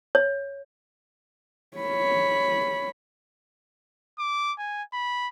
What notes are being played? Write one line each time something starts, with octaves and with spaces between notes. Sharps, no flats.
C#5
C#5 B5
D6
G#5
B5